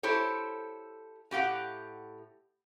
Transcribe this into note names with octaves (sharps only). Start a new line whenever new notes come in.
E4 G4 A4 C5 C#5
A2 G4 F5 F#5